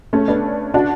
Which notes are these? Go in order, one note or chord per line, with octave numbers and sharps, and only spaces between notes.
A3 C#4
B3 D4
D4 F#4